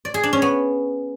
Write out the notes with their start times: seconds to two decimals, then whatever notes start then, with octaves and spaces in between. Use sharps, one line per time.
0.05 D5
0.14 G#4
0.23 D4
0.33 C#4
0.42 B3